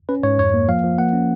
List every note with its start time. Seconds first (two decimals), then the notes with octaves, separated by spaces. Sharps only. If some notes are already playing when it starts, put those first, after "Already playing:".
0.09 C#4 B4
0.23 G#2 C#5
0.38 F2 C#5
0.54 A#3
0.68 F3 F5
0.83 F3
0.98 A#3 F#5
1.13 C#4